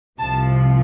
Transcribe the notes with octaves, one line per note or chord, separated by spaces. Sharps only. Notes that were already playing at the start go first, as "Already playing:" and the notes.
C2 C3 F3 A5